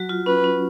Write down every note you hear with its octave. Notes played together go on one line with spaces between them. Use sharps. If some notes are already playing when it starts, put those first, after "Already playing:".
Already playing: F#3 F#4
F4
C#4 B4
C#4